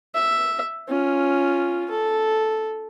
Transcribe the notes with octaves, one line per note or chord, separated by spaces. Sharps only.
E5
C#4 F4
A4